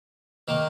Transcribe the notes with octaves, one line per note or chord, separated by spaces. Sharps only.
D#3 A#3